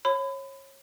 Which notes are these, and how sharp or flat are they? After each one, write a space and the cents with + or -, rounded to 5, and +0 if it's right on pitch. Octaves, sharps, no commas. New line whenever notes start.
C#5 -25 B5 +30